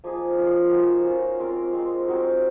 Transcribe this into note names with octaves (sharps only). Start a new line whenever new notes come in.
F3 A#3 D#4 G#4
C#4 F4 A#4 D#5
D#4 F#4 C5 F5
C#4 F4 A#4
G#3 C4 F4 A#4
G#3 C4 D#4
C4 D#4 F#4 A#4